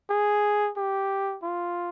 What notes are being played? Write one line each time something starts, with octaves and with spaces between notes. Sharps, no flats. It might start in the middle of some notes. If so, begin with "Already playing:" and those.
G#4
G4
F4